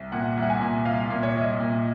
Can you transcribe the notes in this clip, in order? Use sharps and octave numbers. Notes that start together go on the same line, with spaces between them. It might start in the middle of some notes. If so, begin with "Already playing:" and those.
Already playing: C2
A#2 F#5
C2
F#5
G#5
A#2
C2 F5
A#2
C#5
C2
D#5
A#2